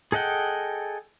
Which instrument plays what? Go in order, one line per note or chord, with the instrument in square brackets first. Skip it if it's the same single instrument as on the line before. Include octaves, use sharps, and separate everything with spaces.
[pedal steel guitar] G#4 A4 D#5 F#5 G5